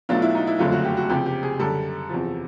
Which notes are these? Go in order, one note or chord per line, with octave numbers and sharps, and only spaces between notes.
B1 B2 F#3 A3 D4 F4
E4
D#4
E4
F#1 F2 D3 F#3 A3 F4
F#4
G4
F#4
C#2 C3 F3 G4
G4
G#4
F#2 D3 G3 A4
E2 C3 F3